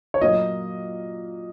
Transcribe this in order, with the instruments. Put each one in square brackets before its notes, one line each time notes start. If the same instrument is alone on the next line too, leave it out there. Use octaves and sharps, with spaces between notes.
[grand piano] C#5
[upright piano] A#2 F#3 A#3 [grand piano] D#5